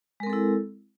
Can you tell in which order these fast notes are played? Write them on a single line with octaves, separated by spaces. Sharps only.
G#3 A#4 C4 A4 E4